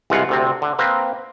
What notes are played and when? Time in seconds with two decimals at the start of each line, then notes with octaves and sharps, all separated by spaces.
0.10 C2 E3 G#3 F4 F#5
0.29 D2 C3 C4
0.62 D3
0.79 A#3 C4 B4